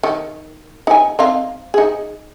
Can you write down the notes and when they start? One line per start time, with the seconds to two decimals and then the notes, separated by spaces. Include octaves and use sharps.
0.03 D#3
0.87 D#4 G#5
1.19 C4 D#4 F5
1.74 D#4 G#4